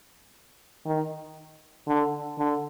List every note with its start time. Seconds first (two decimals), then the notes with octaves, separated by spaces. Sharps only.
0.86 D#3
1.87 D3
2.38 D3